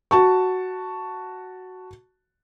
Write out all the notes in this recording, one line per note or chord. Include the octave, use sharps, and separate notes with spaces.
F#4 A5 C#6